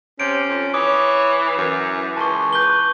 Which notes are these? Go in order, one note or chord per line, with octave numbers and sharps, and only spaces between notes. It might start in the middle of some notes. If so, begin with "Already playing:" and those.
C3 C#4 D7
F2
E3 C#5 D6 D#6
F#2 E3
C#2 A5 C#6
B4 G6 G7